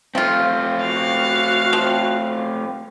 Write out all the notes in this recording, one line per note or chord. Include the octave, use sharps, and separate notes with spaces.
F3 A3 C4 F4
F#4 F5
F3